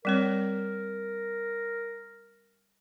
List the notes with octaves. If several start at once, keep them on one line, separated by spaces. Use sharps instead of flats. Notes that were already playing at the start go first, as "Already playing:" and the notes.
G3 C4 A#4 C#5